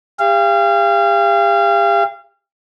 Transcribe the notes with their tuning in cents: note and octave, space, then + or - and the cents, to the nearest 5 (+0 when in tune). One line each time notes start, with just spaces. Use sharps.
G4 +40 F5 -30